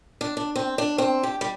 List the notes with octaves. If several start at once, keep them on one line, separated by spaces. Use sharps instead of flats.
D4
D4
C4
D4
C4
G4
G3